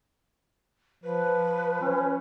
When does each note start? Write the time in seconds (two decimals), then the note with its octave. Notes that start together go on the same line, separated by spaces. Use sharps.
1.04 F3 B4
1.82 C#4